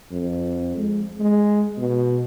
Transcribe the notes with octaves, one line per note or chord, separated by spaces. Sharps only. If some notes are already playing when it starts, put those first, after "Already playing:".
F2
G#3
G#3
B2